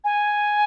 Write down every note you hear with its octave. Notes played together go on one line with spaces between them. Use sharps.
G#5